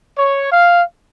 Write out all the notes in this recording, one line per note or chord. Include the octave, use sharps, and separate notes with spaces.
C#5
F5